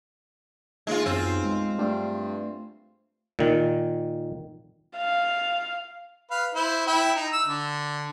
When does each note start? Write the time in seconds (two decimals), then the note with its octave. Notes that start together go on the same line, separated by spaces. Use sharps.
0.87 D#2 G#3 F4
1.06 B1 F#2 C4 F4
1.44 G#3
1.78 G2 A3
3.39 A#2 D#3
4.97 F5
6.31 B4 F5
6.55 E4 C5
6.87 E4 G5 E6
7.16 D#4
7.33 E6
7.46 D3